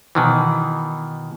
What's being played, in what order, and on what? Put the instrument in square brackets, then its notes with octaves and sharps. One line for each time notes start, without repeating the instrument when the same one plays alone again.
[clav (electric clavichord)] B2 D#3 E3